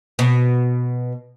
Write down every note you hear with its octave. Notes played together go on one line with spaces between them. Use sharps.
B2